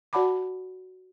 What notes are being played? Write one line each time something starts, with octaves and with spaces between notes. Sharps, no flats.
F#4 D5 F#5 A5 B5 D6